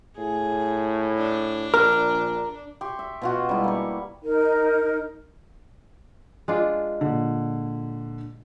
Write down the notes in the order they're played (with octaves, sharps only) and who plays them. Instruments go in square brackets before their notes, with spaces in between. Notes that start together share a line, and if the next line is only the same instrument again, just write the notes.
[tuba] A2 [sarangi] G#4
[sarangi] D4
[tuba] A#1 [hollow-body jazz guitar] A#4 [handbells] F6
[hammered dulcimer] G4 E5 C6 C#6
E5
B2 F4 F#4
G3 G#3 D4 E4
A#3 C#6
[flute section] D#4 A#4
[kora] G#3 D4 F4
[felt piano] A#2 D3